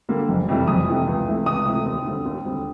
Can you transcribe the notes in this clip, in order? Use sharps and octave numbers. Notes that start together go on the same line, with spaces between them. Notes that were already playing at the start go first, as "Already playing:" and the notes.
D3 G3 A#3
F#1
F2 C3 E3 G3
F#1 D#6
F2 C3 E3 G3
C#2
C3 E3 A3
C#2 D#6
C3 E3 A3
D#2
D3 G3 C4
D#2
D3 G3 C4